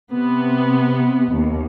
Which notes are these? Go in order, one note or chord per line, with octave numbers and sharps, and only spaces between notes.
C3 B3
D#2